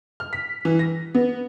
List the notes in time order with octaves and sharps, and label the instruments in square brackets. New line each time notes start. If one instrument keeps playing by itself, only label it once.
[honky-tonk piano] F6
B6
E3
A#6
B3